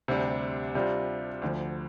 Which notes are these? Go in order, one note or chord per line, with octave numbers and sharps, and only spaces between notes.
D2 C3 G3 D4
C3 G3 D4 F4
D2 D3 F3